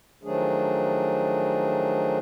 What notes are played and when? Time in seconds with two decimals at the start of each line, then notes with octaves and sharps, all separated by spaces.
0.23 D#3 F3 F#3 A3 D4 G#4